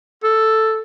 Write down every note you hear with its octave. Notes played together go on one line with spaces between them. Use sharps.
A4